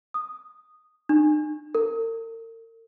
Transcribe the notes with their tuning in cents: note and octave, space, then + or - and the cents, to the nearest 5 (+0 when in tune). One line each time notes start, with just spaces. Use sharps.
D#6 -5
D#4 -45
A#4 -45